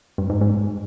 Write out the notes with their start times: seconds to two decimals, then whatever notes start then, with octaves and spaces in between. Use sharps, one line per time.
0.18 G2
0.30 G#2
0.41 G#2